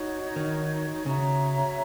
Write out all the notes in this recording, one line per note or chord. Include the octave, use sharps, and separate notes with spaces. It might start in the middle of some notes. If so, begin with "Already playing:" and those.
Already playing: D#4 F#4 C#5
D#3
C#3 F#4 C#5 E5 A#5